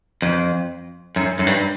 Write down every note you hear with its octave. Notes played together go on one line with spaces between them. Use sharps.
F2
F#2
F#2
G2